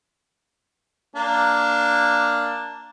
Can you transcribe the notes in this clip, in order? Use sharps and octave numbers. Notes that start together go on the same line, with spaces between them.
A#3 D4